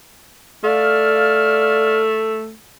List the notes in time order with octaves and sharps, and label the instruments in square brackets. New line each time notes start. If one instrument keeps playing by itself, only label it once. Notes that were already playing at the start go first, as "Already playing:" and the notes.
[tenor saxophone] A3 [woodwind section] D5 F5 F6